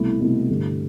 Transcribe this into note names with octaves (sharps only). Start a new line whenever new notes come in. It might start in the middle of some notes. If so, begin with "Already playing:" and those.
Already playing: C2 B2 A3 E4
C2 B2 A3 E4
G2 D3 A3